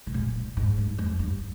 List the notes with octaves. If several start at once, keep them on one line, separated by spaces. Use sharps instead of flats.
C3
A#2
G#2
G2
F2
G2